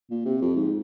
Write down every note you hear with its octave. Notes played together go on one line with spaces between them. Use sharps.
A#2
C3
F2
G#2